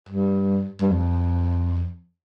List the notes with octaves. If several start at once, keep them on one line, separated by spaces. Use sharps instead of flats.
G2
G2
F2